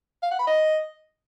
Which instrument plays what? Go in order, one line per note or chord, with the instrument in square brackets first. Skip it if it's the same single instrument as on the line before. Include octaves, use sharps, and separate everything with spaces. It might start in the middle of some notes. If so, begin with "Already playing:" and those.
[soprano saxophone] F5
F#5
B5
D#5